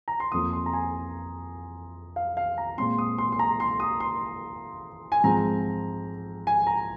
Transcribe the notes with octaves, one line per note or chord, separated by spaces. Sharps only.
A#5
C6
F2 F3 A#3 D#6
C6
A#5
G#5
F5
F5
A#5
A#2 G#3 C4 C6
D#6
C6
C6
A#5
C6
D#6
C6
G#5
G#2 F3 G#3 C4 A#5
G#5
A#5